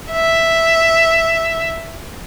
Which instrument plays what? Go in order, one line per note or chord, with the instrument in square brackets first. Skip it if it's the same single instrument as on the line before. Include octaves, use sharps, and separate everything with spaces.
[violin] E5